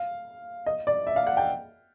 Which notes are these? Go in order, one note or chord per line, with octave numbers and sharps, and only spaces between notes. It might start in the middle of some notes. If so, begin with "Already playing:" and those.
Already playing: F5
D#5
D5
E5
F5
F#5
G5